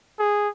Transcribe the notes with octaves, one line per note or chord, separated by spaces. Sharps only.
G#4